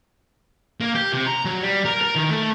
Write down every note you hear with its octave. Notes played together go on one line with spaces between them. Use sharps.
A#3
G4
C3
A#5
F#3
G3
A#4
A#4
D#3
A3